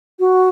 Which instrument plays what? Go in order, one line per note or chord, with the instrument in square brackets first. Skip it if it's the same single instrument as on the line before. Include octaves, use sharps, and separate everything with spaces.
[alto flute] F#4